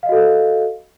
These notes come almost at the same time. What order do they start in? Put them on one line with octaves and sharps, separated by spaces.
F5 D#5 F#4 A4